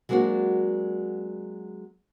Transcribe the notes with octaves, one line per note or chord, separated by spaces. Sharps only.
F#3 G#3 A#3 C4 D4 F#4